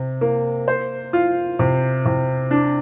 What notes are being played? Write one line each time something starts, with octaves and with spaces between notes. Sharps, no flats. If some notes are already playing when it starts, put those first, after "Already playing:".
Already playing: C3
A#3
C5
F4
C3
C3
D4